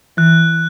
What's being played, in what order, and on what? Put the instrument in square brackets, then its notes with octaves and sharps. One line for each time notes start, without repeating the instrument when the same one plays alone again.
[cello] E3 [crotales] F#6